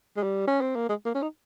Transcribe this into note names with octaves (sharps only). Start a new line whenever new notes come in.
G#3
G3
C#4
C4
A#3
G#3
A#3
C#4
D#4